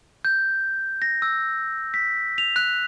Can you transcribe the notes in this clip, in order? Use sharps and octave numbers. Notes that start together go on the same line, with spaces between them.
G6
A#6
E6
B6
F7
F#6